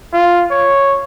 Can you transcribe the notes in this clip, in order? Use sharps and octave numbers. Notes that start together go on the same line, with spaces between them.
F4
C#5